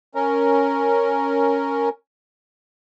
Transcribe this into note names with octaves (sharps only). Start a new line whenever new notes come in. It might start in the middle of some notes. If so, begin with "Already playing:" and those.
C#4 A#4